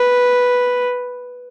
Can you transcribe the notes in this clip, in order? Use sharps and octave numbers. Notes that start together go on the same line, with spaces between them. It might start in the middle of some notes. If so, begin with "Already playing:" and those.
Already playing: B4